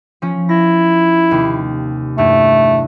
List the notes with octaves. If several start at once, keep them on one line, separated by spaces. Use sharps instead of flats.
F3 C#4
E4 A#6
D#2 C3
E2 G2 A3